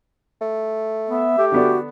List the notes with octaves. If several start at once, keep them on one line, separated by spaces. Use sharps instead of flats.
A3
B3 E5
A3 G4
D3 B3 D4 F#4